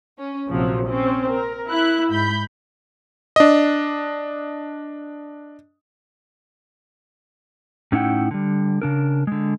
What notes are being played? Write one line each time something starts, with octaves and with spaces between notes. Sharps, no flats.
C#4
A#1 C3 F3 F#3
C4 C#4
A#4
E4 E5 F#6
G#2 B5 G6
D4 D#5
A2 C#4 D#4 E4 F#5 G5
D3 G3
C#3 D4 A#4
D3 G#3